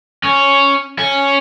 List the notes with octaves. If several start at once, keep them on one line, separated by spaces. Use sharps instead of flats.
C#4
C#4